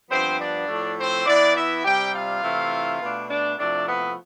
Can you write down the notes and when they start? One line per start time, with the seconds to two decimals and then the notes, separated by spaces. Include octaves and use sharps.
0.09 G2 F3 B3 C4 C5
0.39 D4 D5
0.67 A2 F3 A3
0.97 C4 C5
1.25 E3 B3 D4 E4 D5
1.55 E4 E5
1.84 C3 G3 D4 G4 G5
2.12 F4 F5
2.42 C3 E3 A3 E4
2.99 B2 A3 D4
3.28 D4 D5
3.57 C3 F3 A3 D4 E4 D5
3.86 B3 B4